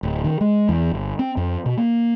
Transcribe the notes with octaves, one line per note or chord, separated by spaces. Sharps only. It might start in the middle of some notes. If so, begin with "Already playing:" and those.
D1
D#3
G#3
E2
G1
C4
F2
B2
A#3